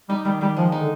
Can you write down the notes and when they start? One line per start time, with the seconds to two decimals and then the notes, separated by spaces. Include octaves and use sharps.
0.09 G3 D#4
0.25 D#3 G3
0.41 D#3 G3
0.57 F3 G#3
0.72 D#4
0.80 D3